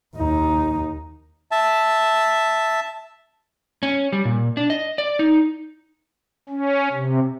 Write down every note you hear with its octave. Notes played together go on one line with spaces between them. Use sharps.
D#2 D#4
E5 A5
C#4
G3
A#2
D4
D#5
D5
D#4
C#4
C3